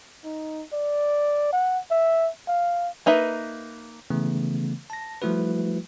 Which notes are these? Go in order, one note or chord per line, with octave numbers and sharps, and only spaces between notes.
D#4
D5
F#5
E5
F5
A#3 D#4 B4 E5
C#3 E3 A3 B3
A5 A#6
F3 G3 A3 E4 F#4 B4